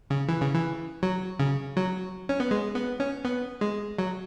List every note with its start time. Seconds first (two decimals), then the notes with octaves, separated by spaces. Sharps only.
0.10 C#3
0.29 E3
0.41 C#3
0.54 E3
1.03 F#3
1.40 C#3
1.77 F#3
2.29 C#4
2.40 B3
2.51 G#3
2.75 B3
3.00 C#4
3.25 B3
3.61 G#3
3.98 F#3